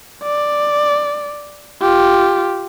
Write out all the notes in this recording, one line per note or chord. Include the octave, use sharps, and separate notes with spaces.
D5
F4 G4